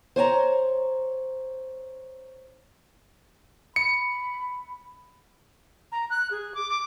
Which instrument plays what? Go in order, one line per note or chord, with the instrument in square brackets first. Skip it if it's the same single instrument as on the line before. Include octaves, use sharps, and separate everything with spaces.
[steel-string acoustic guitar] C5 C#5 G#5 A#5
[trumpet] B5 [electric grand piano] C#7
[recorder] A#5
F#6
G#4
D6
D6